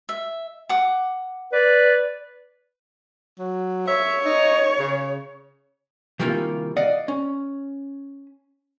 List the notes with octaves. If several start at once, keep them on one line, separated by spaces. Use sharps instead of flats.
E5
F#5 D6
B4 D5
F#3
C#5 E5
D#4
C#3
C3 D#3 E3 G3 A#3 F4
D5 D#5 F5 F#5
C#4